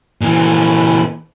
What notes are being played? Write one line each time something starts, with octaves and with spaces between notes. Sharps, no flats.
A#2 E3